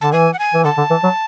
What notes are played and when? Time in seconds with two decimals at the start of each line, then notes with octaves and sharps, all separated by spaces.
0.01 D3 A5
0.12 E3 G#5
0.33 F#5
0.39 G#5
0.54 E3
0.64 D3 A5
0.78 D3
0.90 E3
1.04 F#3